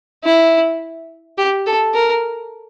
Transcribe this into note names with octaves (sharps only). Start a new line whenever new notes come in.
E4
G4
A4
A#4